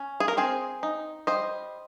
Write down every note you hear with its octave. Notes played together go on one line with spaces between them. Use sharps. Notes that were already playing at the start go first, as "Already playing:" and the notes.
Already playing: C#4
G#4
A#4
C4 G#4 C5
D#4
G3 C5 D#5